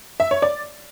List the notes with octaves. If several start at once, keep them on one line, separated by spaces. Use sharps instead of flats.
E5
C#5
D5